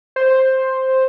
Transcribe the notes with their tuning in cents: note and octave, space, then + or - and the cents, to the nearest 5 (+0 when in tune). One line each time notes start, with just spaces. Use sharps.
C5 +5